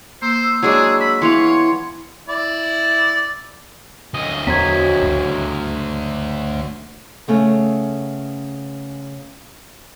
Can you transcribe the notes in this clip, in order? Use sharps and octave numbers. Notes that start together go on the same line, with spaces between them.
A#3 C5 E6
F#3 G#3 D4 G#4
B5
E3 B3 C#5 F5 C6
E4 D5
D2 D#5
E2 F#3 B3 C5 G#6 B6
C#2 G2
C#3 A3 B3